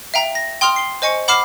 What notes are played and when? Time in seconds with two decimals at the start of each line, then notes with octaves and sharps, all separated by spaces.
0.14 E5 F5 G5 A#5
0.35 A#6
0.61 G5 C6 D#6 F6 F7
0.76 C7 G7
1.02 C5 D#5 G#5 C#6 C#7
1.28 F#5 B5 D6 F6 C7 E7